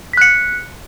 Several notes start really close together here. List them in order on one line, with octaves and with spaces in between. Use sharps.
B6 F#6 C#7